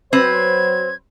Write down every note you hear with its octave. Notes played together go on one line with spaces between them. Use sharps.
F#3 C4 B4 C5 G#6